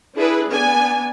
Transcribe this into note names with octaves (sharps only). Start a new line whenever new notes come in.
D4 E4 G#4 B4
B3 D4 G#5